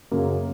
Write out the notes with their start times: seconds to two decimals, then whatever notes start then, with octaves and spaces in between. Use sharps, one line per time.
0.11 F#2 C#3 F#3 A#3